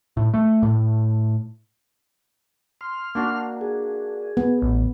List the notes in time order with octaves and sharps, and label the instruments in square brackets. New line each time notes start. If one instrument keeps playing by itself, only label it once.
[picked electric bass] A2
A3
A2
[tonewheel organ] C6 F6
[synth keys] A#3 D4 F#4
[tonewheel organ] G#4
[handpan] B3
[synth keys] A1 [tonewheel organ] A2